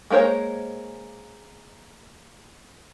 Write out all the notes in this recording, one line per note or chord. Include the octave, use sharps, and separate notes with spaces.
G#3 A#3 A#4 C5 C#5